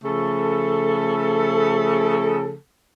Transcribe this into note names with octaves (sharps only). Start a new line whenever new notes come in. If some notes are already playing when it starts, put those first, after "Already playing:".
C#3 F3 A3 A4